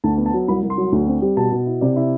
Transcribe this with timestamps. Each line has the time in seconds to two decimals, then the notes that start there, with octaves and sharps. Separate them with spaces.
0.04 D2 A5
0.18 B3
0.26 A5
0.34 F#3
0.48 C2 B5
0.63 C2
0.70 C6
0.77 F#3
0.92 D2
1.07 C4
1.22 G3
1.37 B2 A5
1.52 B2
1.66 E4
1.81 C3 D5
1.96 E4